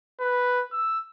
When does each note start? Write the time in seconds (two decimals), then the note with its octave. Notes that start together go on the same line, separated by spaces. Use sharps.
0.20 B4
0.73 E6